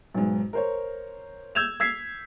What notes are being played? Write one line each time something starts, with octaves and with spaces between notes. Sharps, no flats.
B1 G#2
A#4 C5 C#5
E6 G6 G#6 E7 F7
E6 G#6 B6 C7